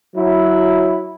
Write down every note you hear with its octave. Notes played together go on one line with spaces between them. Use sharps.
F#3 E4